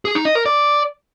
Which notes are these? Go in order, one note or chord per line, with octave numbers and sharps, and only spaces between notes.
G#4
D#4
D#5
A#4
D5